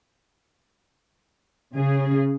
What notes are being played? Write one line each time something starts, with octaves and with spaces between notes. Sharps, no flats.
C#3 G#4